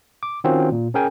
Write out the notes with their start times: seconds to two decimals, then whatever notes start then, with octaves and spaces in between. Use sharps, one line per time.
0.23 D6
0.44 D#3 C4 C#4 F4 F#4
0.72 A#2
0.94 C#4 G#4 A#4 G5 G#5